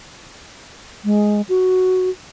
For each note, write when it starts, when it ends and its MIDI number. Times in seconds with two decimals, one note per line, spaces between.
1.05 1.41 56
1.49 2.09 66